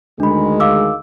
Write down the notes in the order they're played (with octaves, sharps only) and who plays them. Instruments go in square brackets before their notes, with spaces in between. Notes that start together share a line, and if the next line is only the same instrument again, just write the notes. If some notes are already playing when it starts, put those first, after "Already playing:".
[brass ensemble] D2 D#3 G#3 [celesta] D4 B5
[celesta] F5 D6 E6